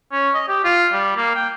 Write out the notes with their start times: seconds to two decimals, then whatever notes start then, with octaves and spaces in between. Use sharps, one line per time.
0.12 C#4
0.34 D#5
0.48 G4
0.64 F4
0.93 G3
1.17 A#3
1.35 G5